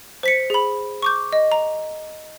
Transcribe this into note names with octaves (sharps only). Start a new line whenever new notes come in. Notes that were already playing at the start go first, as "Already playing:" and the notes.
C5 B6 C#7
G#4 B5
C#6 D6 G6
D#5
A#5